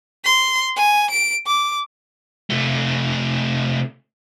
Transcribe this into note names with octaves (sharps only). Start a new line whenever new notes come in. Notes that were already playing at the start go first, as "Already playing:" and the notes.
C6
G#5
D7
D6
C3 A3